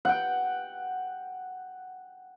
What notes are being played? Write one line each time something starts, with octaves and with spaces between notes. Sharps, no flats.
F#5 G5